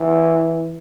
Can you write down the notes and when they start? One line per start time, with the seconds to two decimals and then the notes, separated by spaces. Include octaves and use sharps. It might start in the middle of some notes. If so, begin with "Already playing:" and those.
Already playing: E3